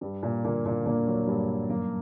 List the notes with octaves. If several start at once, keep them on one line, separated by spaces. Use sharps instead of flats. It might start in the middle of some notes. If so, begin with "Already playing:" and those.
G2 G3
A#2 A#3
A#2 D3 A#3
A#2 A#3
A#2 D3 A#3
F#3
G2 G3
F#2 A#3 A#4